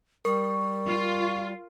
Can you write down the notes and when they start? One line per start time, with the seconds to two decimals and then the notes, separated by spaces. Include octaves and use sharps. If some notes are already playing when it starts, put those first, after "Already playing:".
0.25 G3 A#4 C#6
0.87 F4